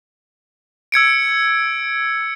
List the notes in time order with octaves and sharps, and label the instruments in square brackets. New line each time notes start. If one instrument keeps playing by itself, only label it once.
[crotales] E6 G#6 C#7 D7